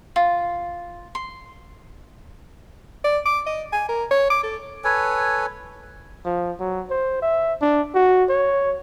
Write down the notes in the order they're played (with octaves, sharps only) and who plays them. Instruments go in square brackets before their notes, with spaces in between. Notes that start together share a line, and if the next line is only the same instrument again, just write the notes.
[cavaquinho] F4
C6
[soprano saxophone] D5
D6
D#5
G#5
A#4
C#5
D6
A4
[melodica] A4 B4 C#5 G#5
[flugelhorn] F3
F#3
C5
E5
D4
F#4
C#5